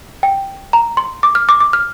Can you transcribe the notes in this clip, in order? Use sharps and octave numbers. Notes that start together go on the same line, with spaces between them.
G5
A#5
C6
D6
F6
D6
D6
F6